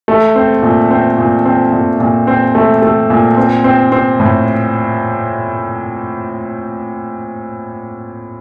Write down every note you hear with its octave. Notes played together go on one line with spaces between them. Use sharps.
A3
C4
A#2
C4
A#2
C4
A#2
A#2
C4
A3
A3
A#2
C4
C4
C4
A2